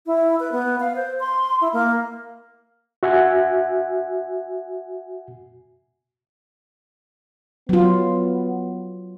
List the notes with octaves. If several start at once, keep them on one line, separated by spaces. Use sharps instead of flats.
E4
B4
B3
F5
C5
C6
E4
A#3
F#4 E5 F#5 G#5
F#3 B3 F4